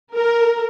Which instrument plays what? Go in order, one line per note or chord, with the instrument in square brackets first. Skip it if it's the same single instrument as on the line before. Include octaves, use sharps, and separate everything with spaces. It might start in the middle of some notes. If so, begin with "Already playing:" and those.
[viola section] A#4